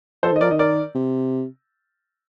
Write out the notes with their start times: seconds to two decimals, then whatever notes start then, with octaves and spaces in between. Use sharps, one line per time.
0.23 F3 A4 C5
0.32 D#3
0.36 D#5
0.41 F3 A#4 D5
0.50 D#3 D#5
0.59 A#4 D5
0.95 C3